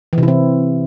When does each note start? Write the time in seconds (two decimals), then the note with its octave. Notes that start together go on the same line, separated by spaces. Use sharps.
0.13 E3
0.18 C3
0.23 E4
0.28 C4